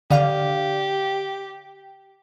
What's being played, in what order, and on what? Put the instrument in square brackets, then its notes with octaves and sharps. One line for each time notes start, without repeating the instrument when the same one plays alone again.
[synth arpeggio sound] D3 D5 F5 [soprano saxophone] G4